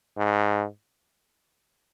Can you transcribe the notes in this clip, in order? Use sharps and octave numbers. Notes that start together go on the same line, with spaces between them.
G#2